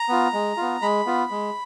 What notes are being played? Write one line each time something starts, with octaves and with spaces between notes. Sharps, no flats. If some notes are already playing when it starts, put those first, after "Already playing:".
Already playing: A#5
B3 F4
G#3
B3 F4
G#3 B5
B3 F4
G#3